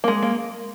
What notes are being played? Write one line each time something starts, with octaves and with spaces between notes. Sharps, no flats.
A#3
G#3
A#3